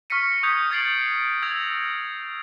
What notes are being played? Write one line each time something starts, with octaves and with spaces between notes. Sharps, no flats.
C#6 F6 A#6 B6 C#7 D#7
C#6 D#6 G6 G#6 B6
D#6 G#6 A6 C7 D7 F#7
E6 G#6 A#6 F7